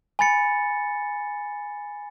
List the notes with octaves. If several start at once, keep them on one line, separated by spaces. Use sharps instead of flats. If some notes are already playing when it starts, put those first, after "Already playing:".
G#5 B5 A6 C#7